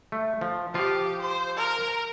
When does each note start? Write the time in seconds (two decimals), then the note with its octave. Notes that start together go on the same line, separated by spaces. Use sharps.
0.12 A3
0.41 F3
0.74 F3 F4 G4
1.21 C5
1.56 A#4